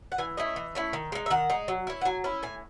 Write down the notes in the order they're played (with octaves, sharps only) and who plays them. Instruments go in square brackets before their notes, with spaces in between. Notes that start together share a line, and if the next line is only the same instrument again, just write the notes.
[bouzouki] F#5
E3 G#5
A3 C#4 E4 D#5
E3
A3 C#4 E4
D#3
G#3 D#4
E5
D#3 F#5
G#3 D#4
F#3
C#4 E4
F#5
F#3 G#5
C#4 E4
A2 G#5